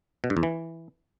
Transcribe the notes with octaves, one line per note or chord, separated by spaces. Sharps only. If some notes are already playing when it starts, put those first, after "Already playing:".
B2
G2
E2
E3